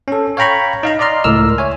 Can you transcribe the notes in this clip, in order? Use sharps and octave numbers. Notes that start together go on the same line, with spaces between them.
C#4 A4
C#5 F5 G5 A#5 B5 C#6
D#4 F5 A#5
D5 D#5 A#5 C6 F6
C#2 A2 A#4 E6 F6
C#5 E5 G#5